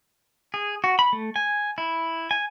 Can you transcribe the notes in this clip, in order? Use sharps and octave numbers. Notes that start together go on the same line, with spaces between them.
G#4
F#4
B5
A3
G#5
E4
G#5